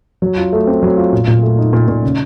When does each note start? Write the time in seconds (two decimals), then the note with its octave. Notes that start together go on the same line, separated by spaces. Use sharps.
0.22 F#3
0.37 F4
0.53 A3
0.67 C4
0.83 F#3
0.97 F4
1.13 A#2
1.27 A#2
1.43 A3
1.58 D#4
1.73 A#2
1.88 A#2
2.03 C#3